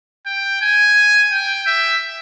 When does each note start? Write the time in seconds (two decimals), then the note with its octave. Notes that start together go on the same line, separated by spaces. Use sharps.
0.26 G5
0.62 G#5
1.31 G5
1.67 E5